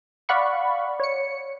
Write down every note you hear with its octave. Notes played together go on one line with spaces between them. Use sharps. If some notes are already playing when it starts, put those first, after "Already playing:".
D5 F5 F#5 B5 C#6
C#5 C#7